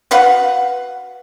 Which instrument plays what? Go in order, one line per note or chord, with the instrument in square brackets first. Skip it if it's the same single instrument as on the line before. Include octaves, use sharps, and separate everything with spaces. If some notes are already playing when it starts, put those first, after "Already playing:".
[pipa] F#4 B4 F5 F#5